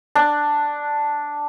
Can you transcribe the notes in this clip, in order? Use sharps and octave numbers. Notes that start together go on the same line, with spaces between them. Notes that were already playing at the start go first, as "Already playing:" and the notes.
D4